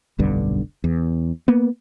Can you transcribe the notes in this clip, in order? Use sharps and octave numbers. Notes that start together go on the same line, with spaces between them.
F1 B1 G2 D3
E2
A#3 B3